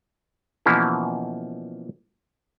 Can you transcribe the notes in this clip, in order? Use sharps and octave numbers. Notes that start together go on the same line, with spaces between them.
B2 E3 F3 A#3 C#4 E4